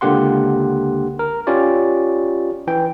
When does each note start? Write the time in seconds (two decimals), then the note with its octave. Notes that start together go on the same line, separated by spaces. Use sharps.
0.01 C#2 D3 A#3 G4 F#5 C6
1.19 A#4
1.47 C#4 F4 G4 C#5 D5
2.67 E3 G5